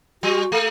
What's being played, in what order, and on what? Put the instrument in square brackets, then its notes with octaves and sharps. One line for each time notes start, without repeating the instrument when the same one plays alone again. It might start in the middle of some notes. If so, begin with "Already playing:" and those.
[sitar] G3 [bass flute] F#4
[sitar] A3 [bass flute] A4